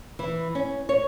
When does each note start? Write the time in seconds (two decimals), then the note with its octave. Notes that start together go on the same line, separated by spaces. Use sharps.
0.19 E3
0.55 C#4
0.89 C#5